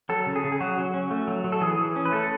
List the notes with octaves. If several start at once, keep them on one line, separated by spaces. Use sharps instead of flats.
F#3 A4
C#3
G#4
C#3
G#4
F#3 F#4
F#3
C#4
A3
F#3
F#3
A4
E3 G#4
E3
C#4
B4
A3 A4